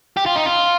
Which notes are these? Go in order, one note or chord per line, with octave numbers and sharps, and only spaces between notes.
G4
F4
D#4
F4